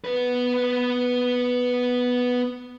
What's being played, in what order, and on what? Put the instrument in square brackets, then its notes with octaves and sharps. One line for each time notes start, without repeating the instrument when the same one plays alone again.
[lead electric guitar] B3 B4